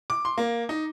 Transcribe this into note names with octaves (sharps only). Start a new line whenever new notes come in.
D6
C6
A#3
D#4